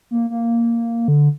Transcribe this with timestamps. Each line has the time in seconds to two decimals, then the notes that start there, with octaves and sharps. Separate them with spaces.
0.11 A#3
0.30 A#3
1.08 D3